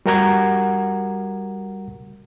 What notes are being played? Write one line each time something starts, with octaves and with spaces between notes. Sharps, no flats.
G3 F#4 A#4 F#5 A#5 G#6